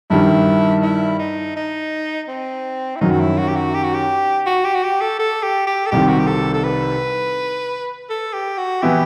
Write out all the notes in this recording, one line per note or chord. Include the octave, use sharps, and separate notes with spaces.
G2 D#3 G3 E4
E4
D#4
D#4
C4
E4
F#2 D#3 F#3 D#4
F#4
E4
F#4
G4
F#4
G4
F#4
G4
F#4
G4
F#4
G4
A4
A4
G4
G4
A4
C2 C3 D#3 G4
F#4
G4
A4
A4
B4
A4
G4
F#4
E3 B3 E4 G4